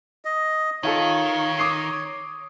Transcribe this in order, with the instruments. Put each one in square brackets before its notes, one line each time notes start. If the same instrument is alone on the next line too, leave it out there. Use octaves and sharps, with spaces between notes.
[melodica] D#5
[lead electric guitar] D#3 [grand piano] D#4 F4 A4 [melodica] C#5
[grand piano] D6 D#6 C7